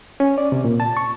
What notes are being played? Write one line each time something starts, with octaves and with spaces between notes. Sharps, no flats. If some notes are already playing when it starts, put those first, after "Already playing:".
C#4
D5
C3
A#2
A5
C#6